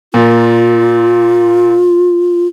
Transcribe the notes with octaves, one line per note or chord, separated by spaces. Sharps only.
A#2 F4